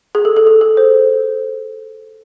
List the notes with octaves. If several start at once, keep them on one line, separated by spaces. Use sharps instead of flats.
G#4
A4
A4
G#4
A4
C5